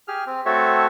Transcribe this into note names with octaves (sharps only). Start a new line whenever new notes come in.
G4 G#4 F6
C4
A3 C4 F#4 A4 C#5 E5